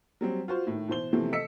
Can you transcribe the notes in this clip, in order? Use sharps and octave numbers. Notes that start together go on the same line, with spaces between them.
F#3 G3 C4
F4 F#4 C5
A2 D#3
B2 E3 C5 G7
E2 C3 E3 F3 A3 C4
A4 D#5 E6 B6 C#7